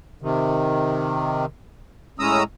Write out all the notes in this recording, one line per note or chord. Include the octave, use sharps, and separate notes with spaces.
C3 D#3
A2 G#3 C#4 A#5 D#6 E6